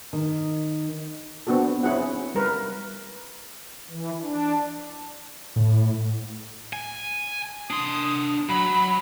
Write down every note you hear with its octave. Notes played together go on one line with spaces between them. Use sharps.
D#3
B3 C4 D4 F#4 A4
C4 C#4 E4 G#4 F#5
G3 A#4 B4
E3
D4
A2
G#5
D4 C6 D#6
F#3 B5